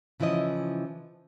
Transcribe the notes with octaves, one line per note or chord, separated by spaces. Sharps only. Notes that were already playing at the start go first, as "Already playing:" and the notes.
C#3 E3 F3 E4 D#5